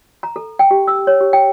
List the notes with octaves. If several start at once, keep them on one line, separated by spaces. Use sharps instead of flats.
A#5
A4
G5
G4
E6
C#5
G4
G5